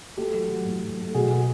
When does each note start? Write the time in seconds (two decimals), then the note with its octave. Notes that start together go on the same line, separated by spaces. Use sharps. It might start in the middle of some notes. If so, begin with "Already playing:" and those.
0.17 A3 G4 A4
0.34 F#3
0.50 F#3
0.66 A2
0.82 F#3
0.99 A3
1.14 B2 F#4 G#4
1.31 A3